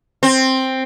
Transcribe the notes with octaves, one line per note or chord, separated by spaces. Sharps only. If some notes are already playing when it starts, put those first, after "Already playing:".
C4